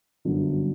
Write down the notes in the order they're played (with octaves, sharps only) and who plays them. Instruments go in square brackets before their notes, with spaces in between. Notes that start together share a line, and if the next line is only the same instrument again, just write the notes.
[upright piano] G1 F#2 D3 F#3 B3